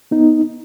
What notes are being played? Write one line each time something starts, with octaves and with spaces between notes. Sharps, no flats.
B3 D#4